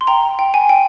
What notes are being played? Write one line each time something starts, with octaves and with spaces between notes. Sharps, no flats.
C6
G5 A#5
G5
G#5
G5